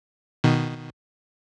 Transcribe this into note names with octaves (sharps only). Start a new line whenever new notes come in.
B2 D#3